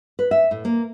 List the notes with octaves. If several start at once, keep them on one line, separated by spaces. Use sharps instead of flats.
B4
E5
A2
A#3